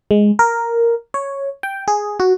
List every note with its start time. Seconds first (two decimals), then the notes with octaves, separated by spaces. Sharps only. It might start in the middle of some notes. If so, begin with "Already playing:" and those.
0.11 G#3
0.39 A#4
1.14 C#5
1.63 G5
1.88 G#4
2.20 F#4